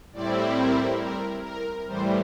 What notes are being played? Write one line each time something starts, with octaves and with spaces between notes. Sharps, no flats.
A2 G3 C4 E4 D5
A#4
A#4
A#4
A2 E3 G3 C5